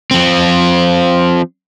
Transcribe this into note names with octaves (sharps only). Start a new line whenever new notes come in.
F3 C4